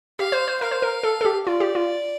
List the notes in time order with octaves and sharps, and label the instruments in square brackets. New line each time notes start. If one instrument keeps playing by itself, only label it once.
[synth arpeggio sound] G4 [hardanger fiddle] F5
[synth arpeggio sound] C5
C5
[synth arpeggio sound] A#4 [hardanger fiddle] F5
[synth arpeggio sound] C5
A#4
A4
A4
G4
[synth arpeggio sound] F4 [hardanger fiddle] D5
[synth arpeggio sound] G4
F4